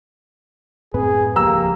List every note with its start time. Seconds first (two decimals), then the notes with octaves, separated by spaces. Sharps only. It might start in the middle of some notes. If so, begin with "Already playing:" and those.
0.94 F#2 A2 C4 G#4 B4
1.36 D#1 C#2 F3 A#3 G4 A#5 E6